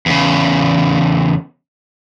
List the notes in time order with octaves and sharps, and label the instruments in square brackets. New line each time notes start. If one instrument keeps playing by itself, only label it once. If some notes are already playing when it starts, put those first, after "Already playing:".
[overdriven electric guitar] E2 C#3